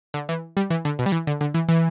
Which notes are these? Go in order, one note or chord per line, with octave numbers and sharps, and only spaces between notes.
D3
E3
G3
E3
D3
B2
G3
E3
D3
D3
E3
E3